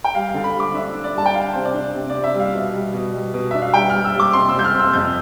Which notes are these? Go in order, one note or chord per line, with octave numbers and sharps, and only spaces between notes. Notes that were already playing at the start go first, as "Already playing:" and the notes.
G5
G3 F5
F5
D3
B5
G3 D6
D4 E5
D4
D5
G3 A5
G5
D4 F5
C3 C5
D5
D4
C3
D5
C3
E5
G3
F5
B2
G3
B2
G3
B2
D4 E5
F5
G3 G5
G3 F6
E6
G3
D6
C3 C6
E6
G3 G6
F6
C3
E6
F2 G6